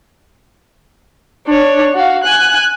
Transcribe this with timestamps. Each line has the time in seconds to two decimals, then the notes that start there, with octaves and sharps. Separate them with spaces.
1.46 D4 C#5
1.95 F#4 F5
2.23 G#5 F#6